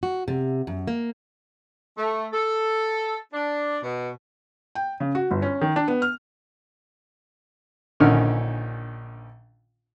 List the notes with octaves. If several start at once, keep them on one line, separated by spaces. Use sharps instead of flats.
F#4
C3
F#2
A#3
A3
A4
D4
B2
G5
C#3
F#4
G1
C#4
D#3
D4
B3
F6
A#1 D3 D#3 C#4 F6